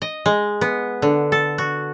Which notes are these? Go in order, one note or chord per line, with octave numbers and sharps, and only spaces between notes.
D#5
G#3
B3
D3
A4
F#4